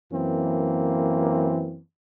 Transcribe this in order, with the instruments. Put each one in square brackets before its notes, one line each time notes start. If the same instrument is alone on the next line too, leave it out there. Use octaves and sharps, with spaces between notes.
[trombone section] F#2 E3 A#3 C4